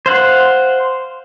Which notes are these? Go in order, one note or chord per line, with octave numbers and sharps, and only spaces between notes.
C5 F5 F#5